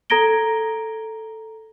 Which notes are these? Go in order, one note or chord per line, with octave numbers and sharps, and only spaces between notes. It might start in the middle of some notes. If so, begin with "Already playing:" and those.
A4 A#5 G#6 A#6 D7 G7